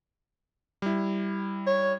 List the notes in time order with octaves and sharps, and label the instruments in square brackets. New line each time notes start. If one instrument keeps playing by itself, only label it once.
[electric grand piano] G3 E4
[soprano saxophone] C#5